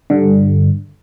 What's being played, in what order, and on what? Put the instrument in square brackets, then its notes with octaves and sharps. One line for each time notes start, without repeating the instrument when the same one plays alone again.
[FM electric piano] G2 D3